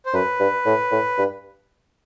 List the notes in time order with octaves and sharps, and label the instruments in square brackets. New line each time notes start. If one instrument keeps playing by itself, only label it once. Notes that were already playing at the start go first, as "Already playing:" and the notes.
[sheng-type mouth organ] C5
[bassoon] F#2 [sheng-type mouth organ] B4
[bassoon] G2
A2
A2
G2